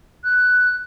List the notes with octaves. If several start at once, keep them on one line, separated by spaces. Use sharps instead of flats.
F#6